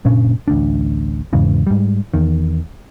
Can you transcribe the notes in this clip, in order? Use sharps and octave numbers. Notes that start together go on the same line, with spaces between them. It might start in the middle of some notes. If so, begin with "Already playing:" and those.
F#1 A#2 C#4 D4
A1 D2 D4
E2 G#2 C#3 E3
G#2 G3
E2 D#3